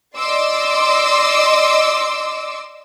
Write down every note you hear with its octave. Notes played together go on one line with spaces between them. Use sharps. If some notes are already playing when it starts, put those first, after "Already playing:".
D5 D#5 C6 D6 E6